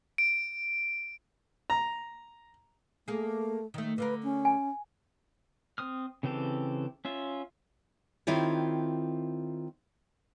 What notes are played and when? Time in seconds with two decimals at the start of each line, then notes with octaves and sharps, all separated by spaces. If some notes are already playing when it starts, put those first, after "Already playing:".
0.18 D7
1.70 A#5
3.08 A3 A#3 G#4
3.74 D#3 A3
3.98 D3 F4 A#4 B4
4.23 C#4
4.45 G#5
5.78 C4 D#6 F6
6.23 C#3 E3 C4 G4 A4
7.05 C#4 F4 E5
8.27 D#3 C4 E4 F4 G4 C#5